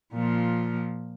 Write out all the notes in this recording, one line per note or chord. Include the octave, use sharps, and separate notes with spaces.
A#2 F3